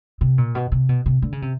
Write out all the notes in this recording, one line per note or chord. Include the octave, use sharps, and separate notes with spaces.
C3
A#2
B2
C3
B2
C3
D3
C#3
C3